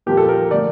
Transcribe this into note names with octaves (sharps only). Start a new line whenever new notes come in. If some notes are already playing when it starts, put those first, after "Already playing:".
A#2 F3 A#3 G4
A4
A#4
D3 F3 A3 D5